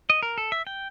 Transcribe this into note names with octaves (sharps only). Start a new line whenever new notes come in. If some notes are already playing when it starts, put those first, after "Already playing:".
D#5
A#4
A4
E5
G5